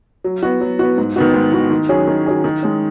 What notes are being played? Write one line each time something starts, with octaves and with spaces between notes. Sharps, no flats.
F#3
B3 F#4
F#3
B3 F#4
G#2
D#3 B3 F#4
G#2
D#3 B3 F#4
D#3
F#3 C#4 G#4
D#3
F#3 C#4 G#4
D#3
G#3 C#4